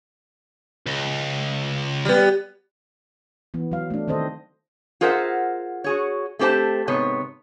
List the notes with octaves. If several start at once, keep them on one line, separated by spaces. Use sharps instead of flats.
C#2
G3 B3
E3 B3
F#3 F5
A3 D4
D#3 C4 A4 C5 D#5
F4 G#4 A#4 C5 E5 F#5
F#4 G#4 C#5
A3 C4 G4 C5 A5
G#2 C3 B3 C#5